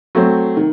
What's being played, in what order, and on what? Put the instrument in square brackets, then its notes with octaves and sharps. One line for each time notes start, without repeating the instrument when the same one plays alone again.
[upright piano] F#3 A3 C4
D#3